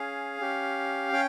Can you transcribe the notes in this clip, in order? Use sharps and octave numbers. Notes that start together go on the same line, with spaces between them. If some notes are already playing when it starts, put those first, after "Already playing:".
Already playing: C#4 G#4 F5
C#4 G4
C#4 G5